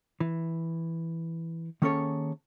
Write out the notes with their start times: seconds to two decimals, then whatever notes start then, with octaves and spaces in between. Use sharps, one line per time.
0.20 E3
1.82 D#3 A#3 C#4 G#4 A4 C#5